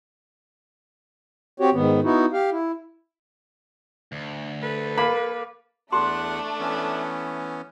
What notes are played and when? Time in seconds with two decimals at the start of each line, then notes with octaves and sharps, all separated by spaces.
1.60 C4 F#4 G4 C#5
1.73 G#2 D#3 B3
2.04 B3 D#4 E4 F#4
2.33 G4 F5
2.52 E4
4.12 D2
4.59 A4 B4
4.98 A#3 B5
5.92 E2 A3 D4 G4 A4 F#5 C6
6.60 E3 B3 C#4